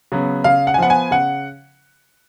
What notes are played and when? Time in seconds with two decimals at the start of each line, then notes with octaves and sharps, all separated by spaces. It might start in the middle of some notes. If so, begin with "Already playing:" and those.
0.12 C#3 F#3 B3
0.44 C#3 F5
0.67 F#5
0.74 G#5
0.78 F3 B3 F#5
0.90 G#5
1.11 C#3 F#5